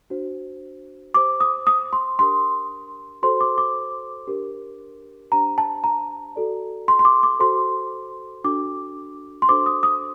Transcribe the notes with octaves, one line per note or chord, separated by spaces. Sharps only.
D4 F#4 C5
G4 C5 D6
D#6
D#6
C6
D4 G4 A#4 C6
F#4 A4 C5 C6
D6
D6
D4 G4 A#4
D4 G4 C5 A#5
A5
A#5
F#4 A4 D5
C6
C6
D6
D6
F#4 A4 C5 C6
D4 F#4 A4 D6
C6
D4 F#4 A4 C5 D6
D#6
D#6